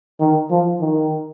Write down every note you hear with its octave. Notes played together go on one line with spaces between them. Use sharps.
D#3
F3
D#3